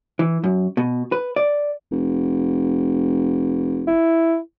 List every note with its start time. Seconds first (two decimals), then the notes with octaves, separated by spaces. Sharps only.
0.19 E3
0.44 F#2
0.77 B2
1.12 B4
1.36 D5
1.91 F1
3.87 E4